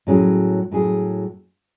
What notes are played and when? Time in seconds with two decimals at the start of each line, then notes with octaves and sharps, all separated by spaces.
0.07 A2 F#3 C#4 G#4
0.72 A2 F#3 C#4 G#4